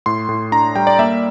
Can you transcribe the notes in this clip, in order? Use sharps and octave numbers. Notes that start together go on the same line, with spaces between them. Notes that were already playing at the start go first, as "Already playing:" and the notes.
A2 C6
A2
D4 A#5
G3 G5
D5
A#3 E5